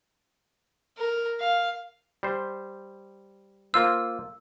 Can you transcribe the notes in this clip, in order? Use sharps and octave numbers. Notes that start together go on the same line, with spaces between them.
A#4
F5
G3 C5
A#3 F4 C5 E6